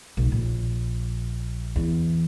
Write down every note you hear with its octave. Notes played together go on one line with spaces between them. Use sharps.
B1
A#1
E2